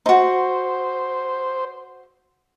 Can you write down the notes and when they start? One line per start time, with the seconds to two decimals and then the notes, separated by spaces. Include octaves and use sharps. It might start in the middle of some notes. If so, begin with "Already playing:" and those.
0.06 D#4 F#4 C5